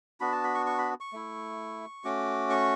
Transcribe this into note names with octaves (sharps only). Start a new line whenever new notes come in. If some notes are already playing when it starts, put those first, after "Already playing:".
B3 D4 F#4 B5
A5
B5
C#6
C#6
B5
C#6
A3 E4
A3 C#4 F#4 D6
C#6